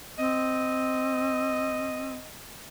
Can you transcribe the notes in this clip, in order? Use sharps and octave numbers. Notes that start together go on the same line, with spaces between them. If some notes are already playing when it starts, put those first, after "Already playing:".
C4 D#5